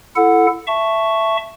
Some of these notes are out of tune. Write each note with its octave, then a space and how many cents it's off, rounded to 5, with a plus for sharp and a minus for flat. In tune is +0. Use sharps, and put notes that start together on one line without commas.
E4 +25 A4 +0 F#5 -10
E5 +10 A5 +0 C#6 +0